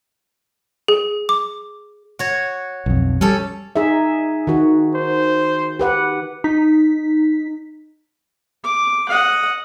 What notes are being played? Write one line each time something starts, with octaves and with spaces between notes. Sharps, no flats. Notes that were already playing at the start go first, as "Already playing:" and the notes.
G#4
D6
F#4 C#5
B1 F2
G3 C#4 A4
D#4 G#4 E5
D#3 F#4
C5
G4 B4 F#5
D#4 B6
D6
D#5 F#5